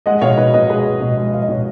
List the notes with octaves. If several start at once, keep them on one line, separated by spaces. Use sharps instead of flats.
G#3 D#5 F#5
B2 C#5 F5
B2 B4 D#5
B2 B4 D#5
G#3 G#4 B4
G#3
B2
G#3
G#3 F5
D#5
B2 C#5